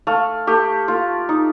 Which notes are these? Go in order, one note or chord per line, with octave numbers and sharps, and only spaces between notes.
A3 F5
A3 G4
A3 F4
D#4